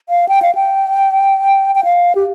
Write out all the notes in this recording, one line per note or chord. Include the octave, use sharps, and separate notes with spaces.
F5
G5
F5
G5
G5
F5
G4